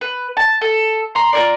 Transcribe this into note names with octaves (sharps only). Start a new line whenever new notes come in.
B4
A5
A4
A#5 C6
F4 A#4 D5